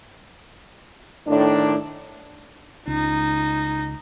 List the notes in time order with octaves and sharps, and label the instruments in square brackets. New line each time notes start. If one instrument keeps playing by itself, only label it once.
[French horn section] A2 D#3 D4
[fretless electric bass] C#2 [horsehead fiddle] D#4